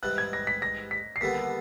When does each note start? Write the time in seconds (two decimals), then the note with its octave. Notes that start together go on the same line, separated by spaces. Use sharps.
0.03 G#2 E3 G3 F#6
0.18 G#6
0.33 A#6
0.47 B6
0.62 A#6
0.91 B6
1.16 C7
1.21 D#2 D3 G3 B3 B6